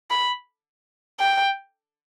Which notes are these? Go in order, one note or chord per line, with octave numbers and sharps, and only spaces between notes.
B5
G5